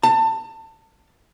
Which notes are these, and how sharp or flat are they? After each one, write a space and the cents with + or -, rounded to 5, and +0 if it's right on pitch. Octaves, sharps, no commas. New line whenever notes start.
A5 +25